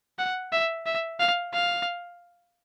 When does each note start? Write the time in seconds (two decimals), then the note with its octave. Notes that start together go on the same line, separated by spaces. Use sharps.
0.19 F#5
0.52 E5
0.86 E5
1.20 F5
1.54 F5